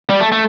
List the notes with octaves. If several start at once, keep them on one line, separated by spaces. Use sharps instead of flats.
G3
A3
A3